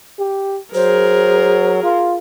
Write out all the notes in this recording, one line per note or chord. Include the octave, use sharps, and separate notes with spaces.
G4
F#3 G#4 A#4 C5
F4